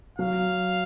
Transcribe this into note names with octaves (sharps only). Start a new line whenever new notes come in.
F#3 F5